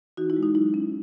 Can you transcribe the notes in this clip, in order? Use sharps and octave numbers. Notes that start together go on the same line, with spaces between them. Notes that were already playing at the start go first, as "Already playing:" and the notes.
E3 D#4 F#4
E4
G#3
D#4
F#3 E4
C#4